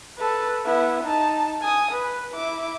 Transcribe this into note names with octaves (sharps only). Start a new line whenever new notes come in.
A4 B4
B3 E4
D#4 A5
G#5 D#6
B4
E4 D6